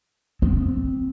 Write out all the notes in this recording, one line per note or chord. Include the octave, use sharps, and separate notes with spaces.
C4